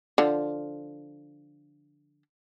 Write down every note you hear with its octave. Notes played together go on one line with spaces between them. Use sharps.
D3 F3